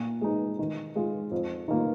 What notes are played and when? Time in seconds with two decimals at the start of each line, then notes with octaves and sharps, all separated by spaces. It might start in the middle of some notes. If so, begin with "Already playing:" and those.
Already playing: A#2
0.21 G#3 D#4
0.59 D#3
0.96 G#3 F4
1.31 F2
1.68 D#3 A#3 F4